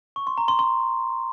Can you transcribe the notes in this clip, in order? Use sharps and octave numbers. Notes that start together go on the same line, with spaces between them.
C#6
C6
A#5
C6
C6